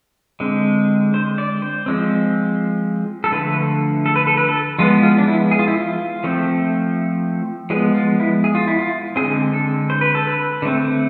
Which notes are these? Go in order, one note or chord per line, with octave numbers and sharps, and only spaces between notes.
D3 G#3 C4
C5
D5
C5
F3 G#3 C4
A4
D3 F3 A3 B4
A4
B4
A4
B4
A4
F3 G#3 B3 F4
F4
D4
E4
G#4
F4
E4
F4
F3 A3 C4
F3 G#3 B3 G#4
F4
E4
G#4
F4
E4
F4
D3 G#3 C4 G#4
A4
C5
B4
A4
B4
D3 A3 C4